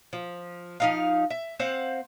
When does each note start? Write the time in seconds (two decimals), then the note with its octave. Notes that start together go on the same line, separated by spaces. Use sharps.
0.13 F3
0.80 F3 D#4 F5
1.30 E5
1.59 C4 C5 F5 F#5